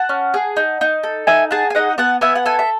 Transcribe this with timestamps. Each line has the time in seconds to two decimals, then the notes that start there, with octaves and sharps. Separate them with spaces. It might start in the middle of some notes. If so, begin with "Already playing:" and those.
Already playing: F#5 A5
0.09 C#4
0.34 G#4
0.57 D#4
0.81 D#4
1.03 A4
1.27 D#4 E5 G#5
1.51 G#4 F#5 A5
1.70 G#5
1.75 D#4 D#5 F#5
1.98 B3 F#5 A5
2.21 B3 E5 G#5
2.35 F#5
2.46 A4 E5 G#5
2.59 E5